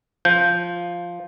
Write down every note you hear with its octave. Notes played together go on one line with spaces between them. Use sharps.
F3 G6